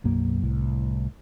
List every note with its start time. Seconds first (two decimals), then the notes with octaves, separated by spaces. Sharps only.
0.04 B1 F#2 F#3 A#3
0.42 C2 A2